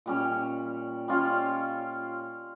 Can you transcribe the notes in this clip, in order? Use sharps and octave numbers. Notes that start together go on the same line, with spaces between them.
A#2 G3 C#4
G3 C#4 F4